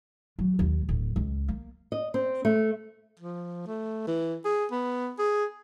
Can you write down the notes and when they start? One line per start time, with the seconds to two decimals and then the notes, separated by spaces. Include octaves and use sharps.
0.39 F#3
0.59 D#2
0.89 D1
1.16 C#2
1.48 A#3
1.92 D#5
2.14 C4
2.45 A3
3.20 F3
3.67 A3
4.07 E3
4.45 G#4
4.71 B3
5.19 G#4